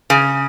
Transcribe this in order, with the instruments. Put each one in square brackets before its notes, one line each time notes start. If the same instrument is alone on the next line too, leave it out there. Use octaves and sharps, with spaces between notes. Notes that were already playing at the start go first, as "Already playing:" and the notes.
[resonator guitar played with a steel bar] C#3